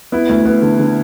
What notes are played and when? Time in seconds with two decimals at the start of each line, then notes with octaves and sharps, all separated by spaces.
0.12 B3 E4
0.29 D2
0.46 B3
0.62 D3
0.79 D3